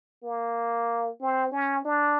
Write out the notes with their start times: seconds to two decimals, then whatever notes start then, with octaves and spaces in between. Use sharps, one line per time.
0.24 A#3
1.21 C4
1.52 C#4
1.85 D4